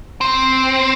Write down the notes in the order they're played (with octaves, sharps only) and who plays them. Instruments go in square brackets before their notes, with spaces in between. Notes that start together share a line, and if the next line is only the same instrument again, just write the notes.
[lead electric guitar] C4